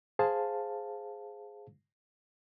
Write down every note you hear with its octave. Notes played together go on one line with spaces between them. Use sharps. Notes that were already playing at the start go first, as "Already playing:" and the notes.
G#4 C5 F5 A5